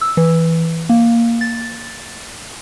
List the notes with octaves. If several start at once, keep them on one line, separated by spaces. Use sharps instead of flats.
E6
E3
A#3
A6